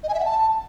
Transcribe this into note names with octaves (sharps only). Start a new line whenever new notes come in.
D#5
G#5
E5
F#5
A5